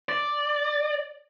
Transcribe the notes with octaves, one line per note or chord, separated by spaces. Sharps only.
D5